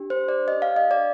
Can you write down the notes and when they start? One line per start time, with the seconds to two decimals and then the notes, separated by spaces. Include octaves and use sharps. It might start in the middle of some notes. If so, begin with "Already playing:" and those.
Already playing: D4 G4
0.10 C5
0.29 D5
0.48 D4 G4 D#5
0.62 F5
0.76 D#5
0.91 D5